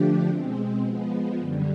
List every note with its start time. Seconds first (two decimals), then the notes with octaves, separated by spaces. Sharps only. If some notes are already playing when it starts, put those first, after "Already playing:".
Already playing: D3 F3 A3 D4 G4
0.27 B2 G#3 C4
0.83 F3 G#3 B3
1.38 F#2 D3 G3